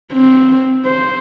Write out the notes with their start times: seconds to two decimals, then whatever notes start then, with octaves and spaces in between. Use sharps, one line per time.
0.13 C4
0.86 C5